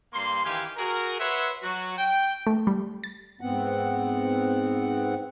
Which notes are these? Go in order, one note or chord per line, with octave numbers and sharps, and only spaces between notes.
G2 A#3 C6
D#3 E3 G4 F5 G#5
F#4 G#4 A#4
B4 C#5 E5 F#5 C6
F#3 F#4
G5
A3
G3
A6
G#2 B3 C4 F#5